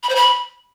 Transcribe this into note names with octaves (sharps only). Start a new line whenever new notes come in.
B5
C5
B5